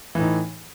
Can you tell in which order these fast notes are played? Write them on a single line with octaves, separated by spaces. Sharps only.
E3 A2 D#4